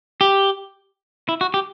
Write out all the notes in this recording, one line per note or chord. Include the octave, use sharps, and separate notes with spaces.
G4
E4
F#4
G4